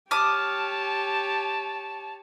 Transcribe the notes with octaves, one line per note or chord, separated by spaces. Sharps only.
G4 C#5 A5 D6 D#6 F6